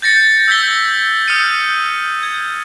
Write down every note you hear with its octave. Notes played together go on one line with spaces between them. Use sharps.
G6 A6 A#6 C#7
E6 G6 G#6 B6 G7
D#6 F6 G6 C#7 D#7
G#6